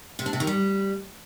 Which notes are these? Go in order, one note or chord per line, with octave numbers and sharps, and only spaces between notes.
C3
D4
C3
D#3
G3